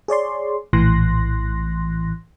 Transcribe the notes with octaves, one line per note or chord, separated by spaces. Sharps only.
G#4 C#5 D5 C6
A#1 A2 E3 C6 F#6 A#6